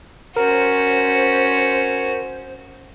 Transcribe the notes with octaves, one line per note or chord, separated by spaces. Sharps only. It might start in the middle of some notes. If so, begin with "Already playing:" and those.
C#4 F#4 A#4 C5